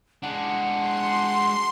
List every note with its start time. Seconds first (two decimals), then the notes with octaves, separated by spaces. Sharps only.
0.23 G#3 D4 F#5
0.73 C6